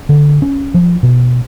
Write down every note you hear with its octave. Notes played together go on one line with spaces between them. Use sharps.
D3
C#4
F3
B2